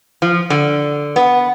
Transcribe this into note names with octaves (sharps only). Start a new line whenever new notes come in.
F3
D3
B3